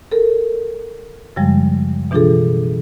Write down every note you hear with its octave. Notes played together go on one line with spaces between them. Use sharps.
A4 A#4
F#2 C#3 F3 G3 G#3
B2 E3 D4 F4 G#4 A4